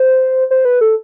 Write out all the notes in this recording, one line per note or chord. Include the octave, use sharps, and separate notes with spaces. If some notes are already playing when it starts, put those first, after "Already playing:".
Already playing: C5
C5
B4
A4